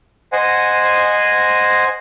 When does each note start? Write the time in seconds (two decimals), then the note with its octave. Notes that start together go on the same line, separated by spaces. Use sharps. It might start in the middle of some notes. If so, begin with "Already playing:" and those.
0.32 C5 D#5 F#5 G#5